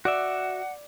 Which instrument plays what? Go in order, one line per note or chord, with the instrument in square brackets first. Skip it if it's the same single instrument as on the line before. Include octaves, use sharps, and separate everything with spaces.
[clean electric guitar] F#4 E5 [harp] D5 [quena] F#5